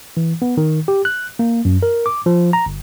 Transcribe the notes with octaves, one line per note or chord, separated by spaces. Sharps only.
E3
B3
D#3
G4
F#6
A#3
F#2
A#4
D6
F3
A#5
G1